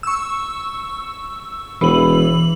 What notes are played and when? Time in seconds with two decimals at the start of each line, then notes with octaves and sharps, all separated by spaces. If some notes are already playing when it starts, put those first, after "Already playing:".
0.03 C#6 E6
1.81 E1 E3 F#7